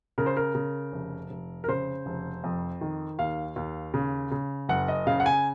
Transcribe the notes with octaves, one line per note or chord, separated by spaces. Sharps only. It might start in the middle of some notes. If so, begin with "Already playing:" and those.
C#3 A#4
C5
A#4
C#3
F1
F1
A#4
C#3 C5
F1
F2
D#3
D#2 F5
D#2
C#3
C#3
F#1 F#5
D#5
C#3 F5
F#5
G#5